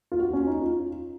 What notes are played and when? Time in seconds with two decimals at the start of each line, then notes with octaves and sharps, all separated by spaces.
0.12 F4
0.19 F#4
0.33 C#4
0.47 D#4
0.61 F4